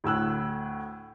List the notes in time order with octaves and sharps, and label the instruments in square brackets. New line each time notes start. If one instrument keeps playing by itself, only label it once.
[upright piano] D2 A2 E6 F#6